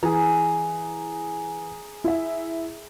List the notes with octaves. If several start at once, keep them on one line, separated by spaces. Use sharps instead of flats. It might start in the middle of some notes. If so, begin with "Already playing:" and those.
E3 G#4 A#5
E4 E5